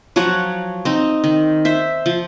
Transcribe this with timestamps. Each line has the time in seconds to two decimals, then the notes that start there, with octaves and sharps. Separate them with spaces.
0.16 F3 F#3 C#5 F#5
0.85 C4 D#4
1.24 D#3
1.65 C5 E5
2.06 F3